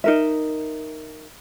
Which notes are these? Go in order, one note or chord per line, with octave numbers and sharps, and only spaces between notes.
D#4 A#4 E5